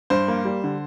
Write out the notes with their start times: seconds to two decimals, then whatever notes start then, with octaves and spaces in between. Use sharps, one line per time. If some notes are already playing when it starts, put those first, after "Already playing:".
0.10 G2 C5
0.28 A#3
0.45 G3
0.64 D3